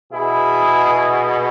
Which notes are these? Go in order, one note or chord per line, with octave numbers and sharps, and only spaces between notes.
B2 E4 G#4